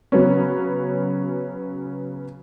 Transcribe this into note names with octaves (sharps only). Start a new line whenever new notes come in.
C#3 F#3 B3 C#4